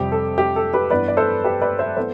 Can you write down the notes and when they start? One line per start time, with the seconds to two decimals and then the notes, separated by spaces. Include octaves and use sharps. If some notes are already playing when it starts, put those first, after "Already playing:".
Already playing: F2 C3 G3 C4 G4
0.12 A4
0.38 G4
0.56 A4
0.73 G4 B4
0.90 G2 E3 B3 B4 D5
1.08 D5
1.17 A4 C5
1.44 G4 B4
1.62 B4 D5
1.79 C5 E5
1.96 E3 B3 A4 C5